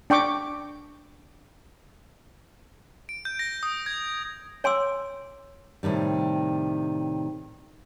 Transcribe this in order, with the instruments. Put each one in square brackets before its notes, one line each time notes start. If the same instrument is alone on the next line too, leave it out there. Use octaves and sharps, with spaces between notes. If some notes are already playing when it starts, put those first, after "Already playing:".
[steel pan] D4 G5 C#6 D6
[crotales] D7
G6
A#6
D#6
G#6
[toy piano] C#5 G#5 C6 D6 E6
[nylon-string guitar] A2 C3 D#3 G3